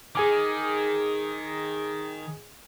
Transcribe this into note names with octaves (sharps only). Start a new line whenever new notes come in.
D#3 G#4 G#5 D6